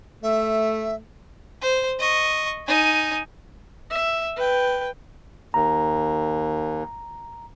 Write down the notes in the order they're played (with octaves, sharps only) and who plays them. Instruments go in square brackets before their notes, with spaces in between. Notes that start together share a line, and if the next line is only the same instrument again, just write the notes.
[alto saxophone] A3 [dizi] E5
[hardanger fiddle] C5
D#5 C#6
D#4 G#5
[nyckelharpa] E5
B4 G5
[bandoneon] D#2 [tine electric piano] A#5